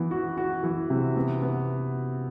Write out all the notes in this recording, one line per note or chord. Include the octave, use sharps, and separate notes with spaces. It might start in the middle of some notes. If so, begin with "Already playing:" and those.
Already playing: E3 B3
F#4
F#4
E3
C3
B3
B3